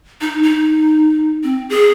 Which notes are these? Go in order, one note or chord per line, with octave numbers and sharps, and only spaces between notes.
D#4
D#4
C4
G#4